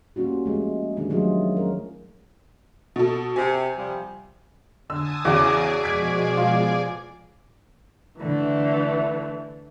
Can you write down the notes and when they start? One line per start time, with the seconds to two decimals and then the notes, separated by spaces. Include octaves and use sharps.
0.16 G3 A#3 C#4 F4 F#4
0.46 F3 G#3 A3
0.96 D#3 G3 G#3 D4
1.10 D#3 F3 F#3 A3 F4 G#4
1.57 C#4 A#4
2.96 B2 A4
3.36 C3 G#5
3.78 C3 F3 G3
4.90 D3 G#5 A5 D#6 E6
5.25 E2 C#3 F#4 G#4 D5 D6
5.82 B2 F3 G#3 G#6 B6 D7
6.37 F4
8.21 D3 E3 A3